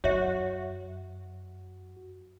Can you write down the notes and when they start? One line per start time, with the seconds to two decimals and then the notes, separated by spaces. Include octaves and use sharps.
0.04 F#2 F#4 C#5 E5